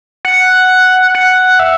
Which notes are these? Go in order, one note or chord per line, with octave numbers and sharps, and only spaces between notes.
F#5
F#5
E5